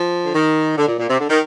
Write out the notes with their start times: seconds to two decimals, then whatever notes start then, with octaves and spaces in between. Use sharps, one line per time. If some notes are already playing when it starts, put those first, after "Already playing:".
Already playing: F3
0.25 D3
0.35 D#3
0.77 D3
0.87 A#2
0.98 A#2
1.09 C3
1.20 D3
1.29 D#3